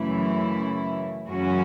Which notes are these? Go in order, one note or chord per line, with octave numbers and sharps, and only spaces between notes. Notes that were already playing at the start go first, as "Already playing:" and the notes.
Already playing: F#2 C#3 E3 A3 E4
F#2 C#3 E3 C#4 F#4